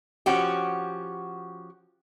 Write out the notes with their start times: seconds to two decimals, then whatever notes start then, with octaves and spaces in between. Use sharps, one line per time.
0.26 F3 C#4 F#4 G4